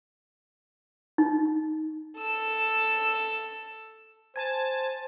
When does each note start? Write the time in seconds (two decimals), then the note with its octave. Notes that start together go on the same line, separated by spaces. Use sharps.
1.18 D#4
2.17 A4 E6
4.36 C5 G#5 A5 A6